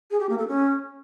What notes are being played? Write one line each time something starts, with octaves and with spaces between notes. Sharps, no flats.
G#4
G4
A#3
A4
C#4